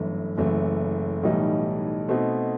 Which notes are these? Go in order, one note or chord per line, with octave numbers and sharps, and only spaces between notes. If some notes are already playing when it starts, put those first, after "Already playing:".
Already playing: G1 F#2 E3 A3
F#1 F#2 E3 A3
B1 A2 E3 G3 D#4
B2 A3 C4 D#4